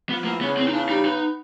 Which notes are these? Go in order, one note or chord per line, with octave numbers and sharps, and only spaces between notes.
F3 B3
E2 A#3
C#3 B3
E2 C4
D#4
C#3 D4
G3 D#4
B3 D#4